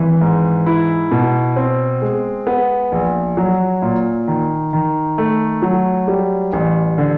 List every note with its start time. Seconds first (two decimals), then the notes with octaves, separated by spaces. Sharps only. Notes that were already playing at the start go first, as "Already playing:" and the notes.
Already playing: G#1 E3
0.21 G#2
0.66 E4
1.11 B2
1.56 C4
2.02 G#3
2.47 B3
2.92 A#1
3.37 F#3
3.82 A#2
4.28 D#3
4.73 D#3
5.18 A3
5.62 F#3
6.08 G3
6.53 A1
6.98 D3